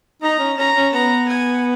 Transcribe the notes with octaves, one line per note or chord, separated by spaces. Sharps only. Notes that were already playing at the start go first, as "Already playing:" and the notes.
D#4 A#5
C#4
C#4 A#5
C#4
B3 A#5
G#5